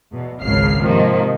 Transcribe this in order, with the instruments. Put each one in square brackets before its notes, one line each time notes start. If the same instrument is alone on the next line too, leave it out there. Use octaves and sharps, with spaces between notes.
[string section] E2 B2
G#1 C#2 C#3 F6 C7
G#2 C3 D#3 F3 A#3